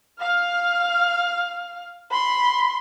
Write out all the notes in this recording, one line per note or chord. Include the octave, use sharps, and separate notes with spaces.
F5 F6
B5 C6